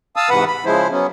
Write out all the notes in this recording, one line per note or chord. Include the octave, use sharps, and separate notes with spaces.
F5 A5 D#6 E6
G#2 C3 E3 B4 F#5 B5
B5
C#3 F3 G#3 E4 C5
F#3 B3 C#4